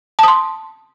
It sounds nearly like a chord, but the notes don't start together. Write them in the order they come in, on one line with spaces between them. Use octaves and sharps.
A5 D#6 C6